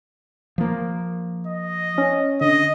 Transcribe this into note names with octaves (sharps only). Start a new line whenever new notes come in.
F3 A#3
D#5
C#4
D3 D#5